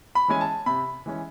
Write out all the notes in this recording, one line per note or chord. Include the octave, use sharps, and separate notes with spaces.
B5
E3 G#3 C#4 G#5
A5
C3 B5
E3 G#3 C#4